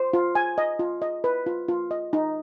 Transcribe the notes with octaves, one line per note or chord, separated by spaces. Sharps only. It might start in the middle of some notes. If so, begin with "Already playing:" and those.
Already playing: C5
F4
G#5
D#5
F4
D#5
B4
F4
F4
D#5
D#4